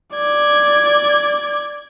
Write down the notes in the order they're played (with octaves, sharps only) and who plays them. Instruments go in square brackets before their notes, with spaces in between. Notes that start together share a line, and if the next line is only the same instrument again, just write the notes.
[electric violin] D5 G#6